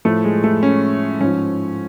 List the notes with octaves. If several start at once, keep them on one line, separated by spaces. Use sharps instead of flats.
A2 F3 A3
G#3
A3
C#4
G#2 F3 C#4